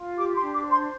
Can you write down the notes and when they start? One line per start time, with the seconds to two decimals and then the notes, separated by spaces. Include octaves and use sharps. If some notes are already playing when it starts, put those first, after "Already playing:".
Already playing: F4
0.17 G4 D6
0.35 C6
0.41 D4
0.53 D6
0.64 C5
0.70 C6